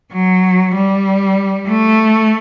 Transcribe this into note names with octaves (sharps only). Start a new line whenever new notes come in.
F#3
G3
A3